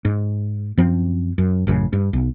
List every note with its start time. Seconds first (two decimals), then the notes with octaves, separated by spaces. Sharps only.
0.05 G#2
0.77 F#2 F3 C4
1.38 F#2
1.67 A1 F#2 C#3
1.93 G2
2.13 B1